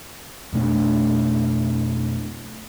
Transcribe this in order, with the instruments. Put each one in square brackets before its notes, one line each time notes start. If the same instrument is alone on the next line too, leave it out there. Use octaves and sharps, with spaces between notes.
[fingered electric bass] F2 B2 A3 D4